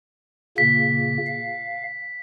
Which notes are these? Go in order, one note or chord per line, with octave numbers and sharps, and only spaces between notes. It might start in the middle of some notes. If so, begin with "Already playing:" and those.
A#2 C#3 A#3 B6
F5